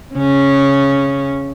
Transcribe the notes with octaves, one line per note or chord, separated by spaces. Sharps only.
C#3 C#4